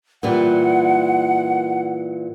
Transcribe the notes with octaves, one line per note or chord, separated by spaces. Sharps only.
A#2 E3 G3 F#5